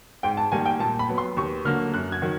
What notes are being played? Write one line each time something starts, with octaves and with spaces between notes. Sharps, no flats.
G#2 G5
A5
D#3 G3 A#3 G#5
G5
A#2 A5
B5
F#3 B3
C6
D#2 C#6
D3 F#3 A#3 F6
F#2 F#6
G#6
D#3 F#3